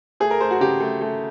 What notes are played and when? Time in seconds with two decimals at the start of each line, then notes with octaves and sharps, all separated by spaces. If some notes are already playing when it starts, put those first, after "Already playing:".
0.20 A3 G#4
0.31 A#4
0.41 A3 C5
0.51 F#4
0.61 C#3 G4
0.80 A3
1.01 A3